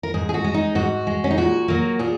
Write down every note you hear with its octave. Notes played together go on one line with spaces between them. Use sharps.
A#4
G#2 G#4
G#4
F#4
G#3
D#4
G#2 F#4
G#3
C#4
D#4
A#2 F#4
F#3 A#3
A#2 G#4